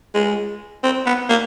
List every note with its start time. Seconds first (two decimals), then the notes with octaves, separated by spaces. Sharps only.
0.14 G#3
0.83 C4
1.06 B3
1.29 A#3